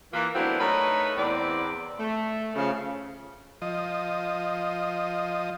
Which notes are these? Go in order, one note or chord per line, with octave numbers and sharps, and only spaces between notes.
E3 A#3 F4
F#3 A3 B3 C4 D4 E4
A3 D#4 A#4 B4 C#5
E2 C4 D5
A3
C#3 F3
F3 D#5